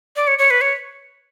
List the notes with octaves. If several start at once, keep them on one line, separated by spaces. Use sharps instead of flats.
D5
C#5
C#5
B4
C#5